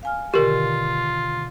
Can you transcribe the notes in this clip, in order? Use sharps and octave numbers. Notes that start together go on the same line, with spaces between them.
F5 G#5 F6
B2 D3 D#3 F4 G4 A#4